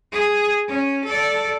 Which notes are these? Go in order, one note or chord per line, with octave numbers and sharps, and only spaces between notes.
G#4
C#4
A4 D5